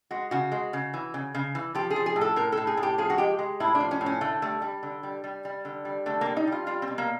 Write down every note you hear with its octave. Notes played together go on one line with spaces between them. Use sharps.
G#3 F#4
C#3 F#4
G#3
C#3
E3
C#3
C#3
E3
F3 G4
G#4
F3
G#4
A2
A4
A2 A#4
A4
A2
G#4
A2
G4
F3 G#4
F#4
G#3 G4
G#3
A2 E4
D4
F3
C#4
A2
C#4
D3 A3
G3 A3
G3
D3
G3
G3
G3
D3
G3
D3 A3
G3 A#3
D#4
G3
F4
G3 F4
C4
B2
A#3